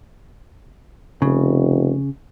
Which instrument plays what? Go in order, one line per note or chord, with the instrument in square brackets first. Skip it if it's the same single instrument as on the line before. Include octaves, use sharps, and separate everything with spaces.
[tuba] F1 [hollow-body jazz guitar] C#3